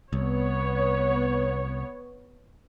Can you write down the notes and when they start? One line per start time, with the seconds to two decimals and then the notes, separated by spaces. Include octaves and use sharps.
0.13 C2 B3 C#5